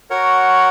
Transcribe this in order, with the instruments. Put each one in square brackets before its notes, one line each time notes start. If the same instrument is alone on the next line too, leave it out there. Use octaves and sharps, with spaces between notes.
[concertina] F#4 A#4 C#5 F#5